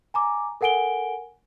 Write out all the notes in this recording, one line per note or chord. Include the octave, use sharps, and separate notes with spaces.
G#5 A#5 D6
A4 A#4 F#5 G#5 D7 G7